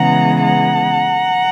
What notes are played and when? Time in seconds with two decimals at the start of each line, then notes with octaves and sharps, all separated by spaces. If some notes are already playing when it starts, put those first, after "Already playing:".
Already playing: C#3 E3 G#3 B3 F#5 A#5
0.43 F#5 A#5